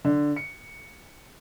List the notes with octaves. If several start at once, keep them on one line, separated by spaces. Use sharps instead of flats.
D3
C#7